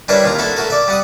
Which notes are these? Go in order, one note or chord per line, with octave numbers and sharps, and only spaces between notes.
G3 D4 E4 A#4 B4 C#5
D#2 F4 A#5
E4 F#4 A4 B5
A3 F#4 A#4
D5 E5
G3 F#5 D#6